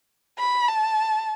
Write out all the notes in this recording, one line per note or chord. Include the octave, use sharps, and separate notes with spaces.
B5
A5